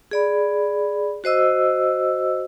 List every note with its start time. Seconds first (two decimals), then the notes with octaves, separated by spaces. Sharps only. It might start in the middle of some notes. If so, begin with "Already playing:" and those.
0.11 G#4 D5 B5
1.24 F#4 C5 D#5 E6